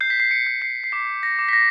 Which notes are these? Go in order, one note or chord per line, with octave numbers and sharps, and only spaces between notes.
G6 C7
B6
C7
C#7
G6
C7
C7
D6 B6
A#6
D6
B6
A#6